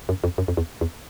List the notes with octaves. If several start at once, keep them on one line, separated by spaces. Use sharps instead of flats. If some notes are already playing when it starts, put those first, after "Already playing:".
F#2
F2
F#2
F2
E2
E2